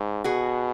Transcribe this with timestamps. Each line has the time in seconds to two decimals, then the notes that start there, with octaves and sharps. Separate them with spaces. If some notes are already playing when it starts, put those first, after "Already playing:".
Already playing: G#2
0.24 B2 F#4 G#4